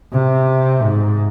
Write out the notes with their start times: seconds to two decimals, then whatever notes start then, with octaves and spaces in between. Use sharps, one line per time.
0.12 C3
0.81 G#2